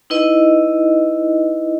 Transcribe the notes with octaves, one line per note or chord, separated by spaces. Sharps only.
D#4 E4 B4 D#5